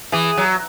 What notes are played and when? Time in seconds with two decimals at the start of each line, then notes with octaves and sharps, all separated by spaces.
0.12 E3 G#4
0.38 F#3